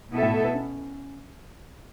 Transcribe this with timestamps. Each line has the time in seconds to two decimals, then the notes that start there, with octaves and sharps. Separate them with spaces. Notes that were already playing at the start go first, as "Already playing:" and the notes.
0.12 B2 B3 E4 A4 E5
0.22 A2
0.34 A3
0.44 B3
0.55 C#4